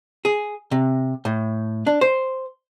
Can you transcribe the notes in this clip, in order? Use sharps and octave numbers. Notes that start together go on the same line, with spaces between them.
G#4
C3
A2
D4
C5